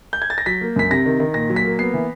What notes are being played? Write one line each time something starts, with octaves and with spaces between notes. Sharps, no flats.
G6
G#6
A6
A#6
F#3 B6
A#3
F#2 B6
C3 A#6
D#3
D#3
A#2 A#6
F#3
B6
A#3
B3 C7
E3